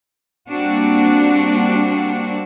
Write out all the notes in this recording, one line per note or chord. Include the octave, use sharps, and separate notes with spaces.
G3 A#3 C4 D4 F#4